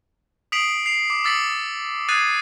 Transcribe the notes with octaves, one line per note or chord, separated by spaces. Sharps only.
D#6 B6 C7 D7 F7 F#7
C7 F7
D6
D6 E6 A6 B6 C#7 F#7
D#6 F#6 G#6 A6 C7 D#7